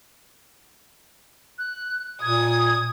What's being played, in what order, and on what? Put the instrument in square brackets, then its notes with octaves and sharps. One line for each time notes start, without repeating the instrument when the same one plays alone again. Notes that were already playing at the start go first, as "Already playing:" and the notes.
[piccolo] F#6
[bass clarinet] A#2 [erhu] D#6 [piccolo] G#6